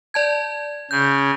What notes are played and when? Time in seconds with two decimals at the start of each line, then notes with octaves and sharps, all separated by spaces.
0.14 D5 A5 G#6
0.91 C#3 G6